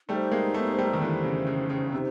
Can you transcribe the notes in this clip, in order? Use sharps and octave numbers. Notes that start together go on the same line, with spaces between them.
G3 A3 D#4 G4 C5
G#3 A#3
A3 B3
G3 A3
D#3
D3 E3 D#4 G4 C5
C#3
C#3
C#3
C3 D#4 G4 C5